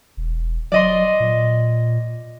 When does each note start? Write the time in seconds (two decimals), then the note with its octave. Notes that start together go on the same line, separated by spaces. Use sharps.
0.17 E1
0.72 F#3 D5 D#5 C6
1.20 A#2